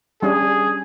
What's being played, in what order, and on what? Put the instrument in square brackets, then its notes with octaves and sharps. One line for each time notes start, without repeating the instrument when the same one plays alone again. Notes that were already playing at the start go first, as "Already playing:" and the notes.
[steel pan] G3 C#4 D4 [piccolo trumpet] G#4